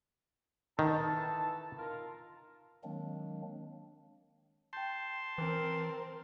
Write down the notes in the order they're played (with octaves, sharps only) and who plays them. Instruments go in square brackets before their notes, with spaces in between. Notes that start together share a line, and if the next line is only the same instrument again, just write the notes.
[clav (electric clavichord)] D#3 [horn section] E3 A4 A5
[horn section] D#4 F4 A#4
[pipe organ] D#3 F#3 G#3 A#3 C4 D4
[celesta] G5 G6 [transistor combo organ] A5 C6
[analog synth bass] E3 [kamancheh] C4 A#4